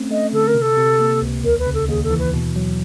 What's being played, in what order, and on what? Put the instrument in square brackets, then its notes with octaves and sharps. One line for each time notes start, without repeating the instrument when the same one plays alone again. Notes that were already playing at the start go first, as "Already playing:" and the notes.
Already playing: [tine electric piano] A3 C4 C#4
[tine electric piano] A3 [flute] D#5
[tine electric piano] D3 [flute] A4
[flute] A#4
[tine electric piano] C3
[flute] A4
[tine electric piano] C3
A#3
C#2
[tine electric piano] D#2 [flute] A#4
[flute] B4
[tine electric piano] C#3
[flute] A4
[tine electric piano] D#2 [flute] G#4
[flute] A4
[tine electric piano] E3
[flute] B4
[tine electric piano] B2
F#3